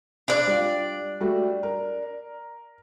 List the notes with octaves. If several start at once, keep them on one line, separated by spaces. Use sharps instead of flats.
D4 D5
G3 F4
G3 A3 F#4
A#4